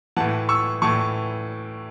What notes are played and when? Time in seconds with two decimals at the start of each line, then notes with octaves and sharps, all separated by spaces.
0.16 A2 E3 F#5 A5
0.49 C#6 E6
0.82 A2 E3 A5 C#6